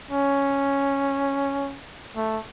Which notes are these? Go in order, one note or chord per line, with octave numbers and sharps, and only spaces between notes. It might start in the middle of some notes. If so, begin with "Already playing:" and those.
C#4
A3